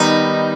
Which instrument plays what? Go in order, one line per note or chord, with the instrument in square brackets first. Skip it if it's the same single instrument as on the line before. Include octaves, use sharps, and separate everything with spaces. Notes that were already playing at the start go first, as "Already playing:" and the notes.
Already playing: [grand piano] D#3 G3 B3 [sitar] D#4